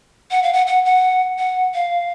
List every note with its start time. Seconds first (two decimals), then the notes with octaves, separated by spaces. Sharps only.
0.31 F#5
0.43 F5
0.53 F#5
0.67 F#5
0.85 F#5
1.38 F#5
1.74 F5